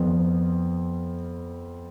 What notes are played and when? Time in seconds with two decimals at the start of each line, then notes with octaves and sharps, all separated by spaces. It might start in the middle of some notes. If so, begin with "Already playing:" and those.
Already playing: F2 F3 B3